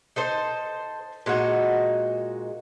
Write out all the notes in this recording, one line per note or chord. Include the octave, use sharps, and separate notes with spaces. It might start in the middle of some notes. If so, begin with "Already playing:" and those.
D#4 A4 C5
A#2 G#3 D#4 F#4